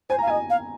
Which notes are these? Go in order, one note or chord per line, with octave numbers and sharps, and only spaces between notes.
C5 G#5
F5 A#5
D#5 G#5
F5